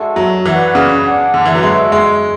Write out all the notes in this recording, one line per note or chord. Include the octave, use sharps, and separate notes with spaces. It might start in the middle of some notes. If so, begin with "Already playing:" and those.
Already playing: G#3 D4 F#4 A4 E5
F#3
E3 F#4 B4 D5 F#5
C#3
D4 G#4 D5 F#5
D3
E3
F#3
G#3 D4 F#4 A4 E5
G#3